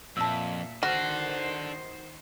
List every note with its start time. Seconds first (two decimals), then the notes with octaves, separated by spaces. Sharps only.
0.17 F2 A#2 E5 A5 E6
0.83 D#3 D4 F#4 A4 C5 F6